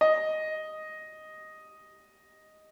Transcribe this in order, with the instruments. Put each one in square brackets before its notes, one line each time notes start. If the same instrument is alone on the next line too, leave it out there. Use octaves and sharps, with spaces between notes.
[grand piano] D#5